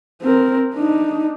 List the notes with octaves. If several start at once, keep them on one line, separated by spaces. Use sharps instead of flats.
C4 A#4
D4 D#4